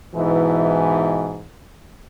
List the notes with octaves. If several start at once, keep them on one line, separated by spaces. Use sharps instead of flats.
G#2 B2 E3